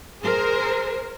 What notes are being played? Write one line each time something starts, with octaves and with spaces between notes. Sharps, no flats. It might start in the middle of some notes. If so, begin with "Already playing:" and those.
G#4 A#4 C5